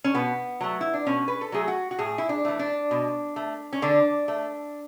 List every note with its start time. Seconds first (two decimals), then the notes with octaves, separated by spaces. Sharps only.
0.04 C#4
0.14 B2 B3
0.61 F#3 A3
0.81 E4
0.94 D4
1.07 B2 C#4
1.28 B4
1.41 A4
1.52 F#3 A3 G#4
1.68 F#4
1.91 F#4
1.99 A2 G#4
2.18 E4
2.29 D4
2.45 E3 A3
2.59 D4
2.91 B2
3.36 A3
3.73 C#4
3.82 D3 D4
4.28 A3